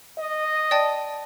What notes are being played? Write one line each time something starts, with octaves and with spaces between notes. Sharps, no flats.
D#5
D5 G5 A5